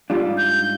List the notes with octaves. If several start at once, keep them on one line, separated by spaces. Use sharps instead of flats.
G#2 G3 D4 F4
G6